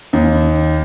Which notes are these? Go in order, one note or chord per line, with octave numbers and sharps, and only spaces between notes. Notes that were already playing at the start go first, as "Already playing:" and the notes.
D#2